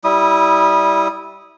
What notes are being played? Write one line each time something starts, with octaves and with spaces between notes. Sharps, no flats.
G3 E4 D#6